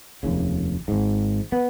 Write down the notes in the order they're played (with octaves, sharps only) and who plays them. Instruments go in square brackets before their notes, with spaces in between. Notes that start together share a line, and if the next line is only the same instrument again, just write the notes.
[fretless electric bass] F1 D#2 C#3
G#1 G#2
B3